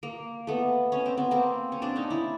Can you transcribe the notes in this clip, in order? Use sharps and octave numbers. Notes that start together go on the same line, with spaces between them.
A#3
A3 B3
C#4
C4
B3
A#3 C4
C#4
C4 D4
C#4 D#4
D4 E4